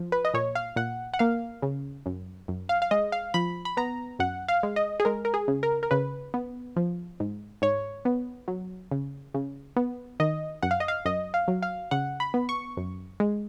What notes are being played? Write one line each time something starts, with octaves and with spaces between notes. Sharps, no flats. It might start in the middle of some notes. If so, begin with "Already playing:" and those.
Already playing: F3
B4
D#5
A#2 C#5
F5
A#2 F#5
F#5
A#3 F5
C#3
F#2
F#2
F5
F5
G#3 D#5
F5
F3 B5
B5
B3 A#5
F#2 F#5
F5
G#3
D#5
G#4
G#3 A#4
A#4
G#4
C#3
A#4
A#4
C#3 B4
B3
F3
G#2
G#2 C#5
B3
F#3
C#3
C#3
B3
D#3 D#5
F#2 F#5
F5
D#5
F5
F#2 D#5
F5
F#3
F5
C#3 F#5
B5
B3
C#6
F#2
G#3